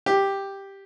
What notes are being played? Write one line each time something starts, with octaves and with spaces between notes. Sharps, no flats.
G4